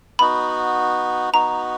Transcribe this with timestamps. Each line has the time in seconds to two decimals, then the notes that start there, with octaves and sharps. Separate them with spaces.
0.19 B3 D#4 F#4 B5
1.33 B3 D#4 F#4 A#5